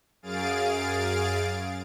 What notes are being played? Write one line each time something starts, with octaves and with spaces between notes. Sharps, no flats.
F#2 G#4 F5 A6 D7